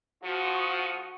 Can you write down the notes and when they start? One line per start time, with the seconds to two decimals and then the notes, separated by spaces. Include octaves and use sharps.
0.24 F3 F#4 C#6 D#6